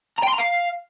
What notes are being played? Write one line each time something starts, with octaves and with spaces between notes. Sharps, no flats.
A#5
G5
C6
A#5
F5